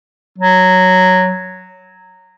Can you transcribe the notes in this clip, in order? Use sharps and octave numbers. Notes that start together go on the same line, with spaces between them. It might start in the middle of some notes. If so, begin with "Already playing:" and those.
F#3